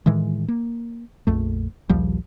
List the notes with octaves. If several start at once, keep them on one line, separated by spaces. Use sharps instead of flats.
A2 D#3 E3 G#3
A#3
A#1 F2 A3
A#1 D#2 F3 G3